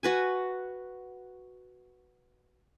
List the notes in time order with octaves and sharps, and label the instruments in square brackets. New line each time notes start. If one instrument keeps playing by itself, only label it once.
[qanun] F#4 B4 G#5